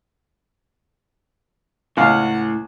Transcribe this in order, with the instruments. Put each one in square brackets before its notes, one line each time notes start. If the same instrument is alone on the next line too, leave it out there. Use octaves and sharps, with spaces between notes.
[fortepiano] C#2 F5 [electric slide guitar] A2 [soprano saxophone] F#5